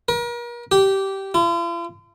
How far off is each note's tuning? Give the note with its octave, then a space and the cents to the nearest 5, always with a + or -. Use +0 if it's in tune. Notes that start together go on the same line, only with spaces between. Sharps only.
A#4 +40
G4 -15
F4 -45